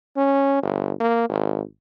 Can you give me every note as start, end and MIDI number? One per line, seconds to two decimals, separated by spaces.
0.17 0.62 61
0.62 0.92 31
1.00 1.27 58
1.29 1.61 32